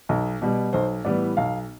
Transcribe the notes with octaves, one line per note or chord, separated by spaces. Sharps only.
B1
B2 G3
B1 C5
A2 E3 G3 B3 D5
B1 F5